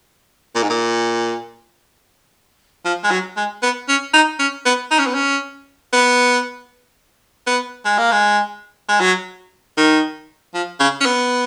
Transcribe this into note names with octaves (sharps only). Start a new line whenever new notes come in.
A#2
G#2
A#2
F3
G#3
F#3
G#3
B3
C#4
D#4
C#4
B3
D#4
C#4
B3
C#4
B3
B3
G#3
A#3
G#3
G#3
F#3
D#3
F3
C#3
C#4
B3